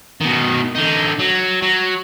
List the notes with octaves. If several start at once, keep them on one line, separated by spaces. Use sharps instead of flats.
B2 D#3
D3 D#4
F#3
F#3